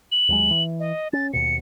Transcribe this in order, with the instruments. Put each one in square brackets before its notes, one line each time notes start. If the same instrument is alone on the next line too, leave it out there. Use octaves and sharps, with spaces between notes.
[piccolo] F#7
[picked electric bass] D#2 F#3 G#3
E3
[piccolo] D#5
[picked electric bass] C#4 [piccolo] A6
[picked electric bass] D#2 B2 [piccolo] C#7